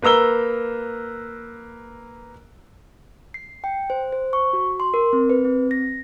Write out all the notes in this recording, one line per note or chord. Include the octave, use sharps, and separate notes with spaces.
A#3 B4 A#5 E6 G7
C7
G5
C5
C5
C#6
F#4
C6
A#4
C4
B4
C4
A#6